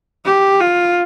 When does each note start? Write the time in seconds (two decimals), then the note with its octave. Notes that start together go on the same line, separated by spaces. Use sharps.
0.25 G4
0.60 F4